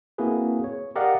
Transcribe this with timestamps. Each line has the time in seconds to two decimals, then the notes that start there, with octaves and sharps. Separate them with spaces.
0.18 A#3 C4 E4 F#4 G#4 B4
0.64 C#5
0.96 G4 A#4 D5 D#5 F5 F#5